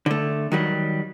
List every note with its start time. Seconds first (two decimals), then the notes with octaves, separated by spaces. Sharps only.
0.06 D3 A3
0.52 D#3 F#3 G3